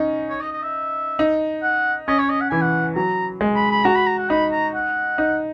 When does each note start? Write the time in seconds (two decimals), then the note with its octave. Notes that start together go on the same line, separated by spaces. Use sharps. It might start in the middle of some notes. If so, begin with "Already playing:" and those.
Already playing: C#4 D#4
0.30 C#5
0.41 D#5
0.52 D#5
0.63 E5
1.19 D#4
1.63 F#5
2.08 C#4 D#5
2.19 C#5
2.30 D#5
2.41 F#5
2.51 E3 G#5
2.62 F#5
2.96 F#3 A#5
3.41 G#3
3.56 B5
3.71 B5
3.85 F#4 A#5
3.96 B5
4.07 A#5
4.18 F#5
4.30 D#4 B5
4.52 A#5
4.75 F#5
5.18 D#4